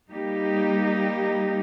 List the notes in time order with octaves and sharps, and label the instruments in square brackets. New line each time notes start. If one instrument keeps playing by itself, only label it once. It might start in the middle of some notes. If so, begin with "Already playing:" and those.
[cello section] G3 A#3 D#4 G4